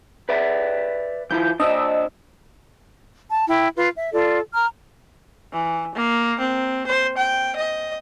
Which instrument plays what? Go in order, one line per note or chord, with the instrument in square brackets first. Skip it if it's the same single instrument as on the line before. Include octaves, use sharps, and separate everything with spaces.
[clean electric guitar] B4 D5 E5
[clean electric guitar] E3 E4 F4 [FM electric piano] G6
[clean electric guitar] D4 C5 D5 [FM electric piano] D#5 E6
[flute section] A5
E4 G5
F4 B4
E5
F4 A4 D5
A#5 F6
[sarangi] E3
A#3
C4
C5
G5
D#5